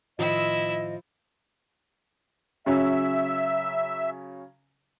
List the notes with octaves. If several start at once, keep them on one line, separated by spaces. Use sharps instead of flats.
A2 D#3 F3 E4 D#5 E6
C#3 F#3 C#4 E5